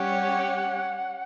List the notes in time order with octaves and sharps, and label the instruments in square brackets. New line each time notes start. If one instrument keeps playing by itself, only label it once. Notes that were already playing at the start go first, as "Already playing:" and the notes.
Already playing: [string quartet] G3 C#4 G4 C#5 [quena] F#5